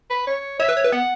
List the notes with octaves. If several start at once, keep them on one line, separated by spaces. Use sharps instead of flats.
B4
C#5
C#5 E5
B4
C#5
B4
B3 F#5